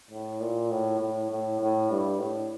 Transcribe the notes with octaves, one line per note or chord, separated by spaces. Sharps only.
A2
A#2
A2
A2
A2
A2
G2
A2